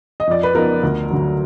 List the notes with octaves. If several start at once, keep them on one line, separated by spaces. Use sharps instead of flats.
D#5
F2 D5
B4
F3 B3 D#4 A#4
D2
D3 F#3